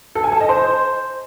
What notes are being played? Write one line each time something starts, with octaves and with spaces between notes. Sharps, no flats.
A4
G#5
A5
D#5
C5